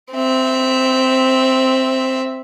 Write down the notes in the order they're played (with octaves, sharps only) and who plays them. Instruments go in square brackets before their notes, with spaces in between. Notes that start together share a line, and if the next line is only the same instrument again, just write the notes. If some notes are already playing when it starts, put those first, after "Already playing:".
[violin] C4 E5